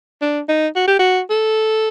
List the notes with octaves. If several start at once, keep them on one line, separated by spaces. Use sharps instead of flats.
D4
D#4
F#4
G4
F#4
A4